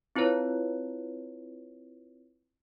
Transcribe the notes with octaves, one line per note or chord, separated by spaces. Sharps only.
C4 E4 F4 B4 C#5